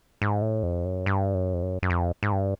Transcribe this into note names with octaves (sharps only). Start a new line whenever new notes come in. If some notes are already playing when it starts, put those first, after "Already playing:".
G#2
A2
F2
F#2
G2
F#2
F2
F#2
F#2
F2
G#2
G2